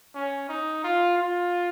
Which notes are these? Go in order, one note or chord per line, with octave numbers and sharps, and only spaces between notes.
C#4
D#4
F4
F4